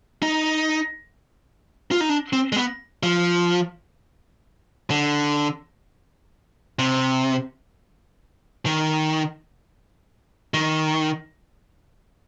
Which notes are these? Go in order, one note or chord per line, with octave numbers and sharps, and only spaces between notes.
D#4
F4
D#4
D4
C4
G#3
B3
F3
D3
C3
D#3
D#3